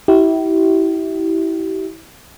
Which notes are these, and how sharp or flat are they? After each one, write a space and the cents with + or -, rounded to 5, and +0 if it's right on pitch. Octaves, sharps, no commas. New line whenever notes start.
E4 -20 G4 -35